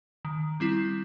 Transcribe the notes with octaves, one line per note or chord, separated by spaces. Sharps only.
D#3
G3 C4 E4